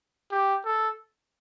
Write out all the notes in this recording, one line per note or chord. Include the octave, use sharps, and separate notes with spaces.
G4
A4